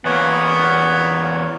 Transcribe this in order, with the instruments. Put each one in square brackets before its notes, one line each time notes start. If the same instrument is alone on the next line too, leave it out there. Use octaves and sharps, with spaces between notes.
[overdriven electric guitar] E2 A#3 [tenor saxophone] B3 [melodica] C#5